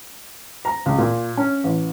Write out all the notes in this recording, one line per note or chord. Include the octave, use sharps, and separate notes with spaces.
A#5
C#2
A#2
C#4
A1